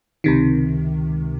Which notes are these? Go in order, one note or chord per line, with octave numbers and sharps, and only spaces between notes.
C#2 C3 D#3